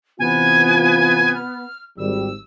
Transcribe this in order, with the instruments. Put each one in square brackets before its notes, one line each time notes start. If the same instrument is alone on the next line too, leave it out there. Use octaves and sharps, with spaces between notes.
[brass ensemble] C3 E3 F4 [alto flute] B3 [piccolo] G#5
[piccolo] F6
[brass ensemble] G#1 G3 [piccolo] E6